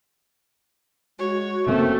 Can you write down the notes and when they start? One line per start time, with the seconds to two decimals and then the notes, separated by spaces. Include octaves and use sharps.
1.19 G#3 F#4 C#5
1.67 F#1 C#3 A3 A#3 C4